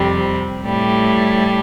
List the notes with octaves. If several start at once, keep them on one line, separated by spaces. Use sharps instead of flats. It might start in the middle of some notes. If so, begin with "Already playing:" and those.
Already playing: F2 C3 G3
A2 G3